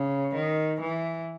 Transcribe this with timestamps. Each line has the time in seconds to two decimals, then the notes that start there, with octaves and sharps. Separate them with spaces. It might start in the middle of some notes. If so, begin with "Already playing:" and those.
Already playing: C#3
0.34 D#3
0.81 E3